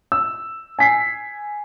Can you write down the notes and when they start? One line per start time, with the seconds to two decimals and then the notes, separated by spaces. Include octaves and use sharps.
0.12 E6
0.79 G#5 B6 C7